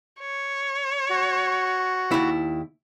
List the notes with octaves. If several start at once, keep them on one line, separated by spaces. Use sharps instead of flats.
C#5
F#4
D#2 E4